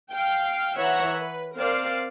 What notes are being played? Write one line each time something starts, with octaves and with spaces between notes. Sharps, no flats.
F5 G5
E3 C#5 E5 F#5 A#5
B4
C4 A#4 C5 D5 F5